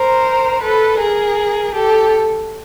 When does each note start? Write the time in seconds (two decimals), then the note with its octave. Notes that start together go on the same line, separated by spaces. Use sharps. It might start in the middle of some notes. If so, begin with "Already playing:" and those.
Already playing: A#4 C5
0.62 A4 B4
0.99 G#4 A#4
1.74 G4 A4